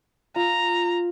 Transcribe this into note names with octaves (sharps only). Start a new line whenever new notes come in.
F4 A#5